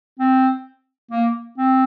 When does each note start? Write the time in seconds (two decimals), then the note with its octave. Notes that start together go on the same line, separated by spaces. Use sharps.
0.19 C4
1.11 A#3
1.58 C4